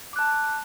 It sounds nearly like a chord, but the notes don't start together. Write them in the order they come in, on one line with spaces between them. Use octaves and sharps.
D6 F#6 A5